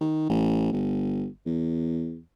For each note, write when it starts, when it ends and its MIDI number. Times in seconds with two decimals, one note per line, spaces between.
0.01 0.28 51
0.29 0.69 33
0.72 1.26 31
1.46 2.18 40